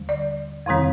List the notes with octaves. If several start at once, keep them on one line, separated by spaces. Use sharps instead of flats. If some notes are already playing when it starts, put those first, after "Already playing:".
Already playing: D#2 D3 G3
D5
F2 C3 D#3 G3 C4